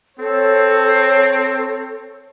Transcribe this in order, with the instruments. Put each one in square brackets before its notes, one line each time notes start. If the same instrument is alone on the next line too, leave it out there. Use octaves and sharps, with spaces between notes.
[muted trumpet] C4 [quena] A4 [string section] C#5